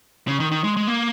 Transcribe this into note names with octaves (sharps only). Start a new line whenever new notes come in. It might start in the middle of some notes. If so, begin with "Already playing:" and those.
C#3
D#3
D#3
G#3
G#3
A#3